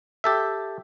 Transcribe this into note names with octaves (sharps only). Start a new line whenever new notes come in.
G4 A4 E5